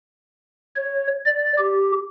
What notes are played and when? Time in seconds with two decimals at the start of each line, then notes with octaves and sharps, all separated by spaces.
0.76 C#5
1.25 D5
1.58 G4